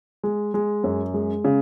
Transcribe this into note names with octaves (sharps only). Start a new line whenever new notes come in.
G#3
G#3
F#2
G#3
C#3